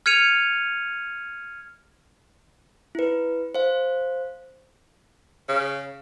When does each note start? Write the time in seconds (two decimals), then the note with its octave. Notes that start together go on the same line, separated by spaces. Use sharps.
0.06 F6 G#6 C#7 D#7 F7
2.95 E4 B4
3.55 C5 F5
5.49 C#3